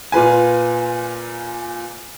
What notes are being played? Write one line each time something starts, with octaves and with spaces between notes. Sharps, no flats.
A#2 F4 B4 G#5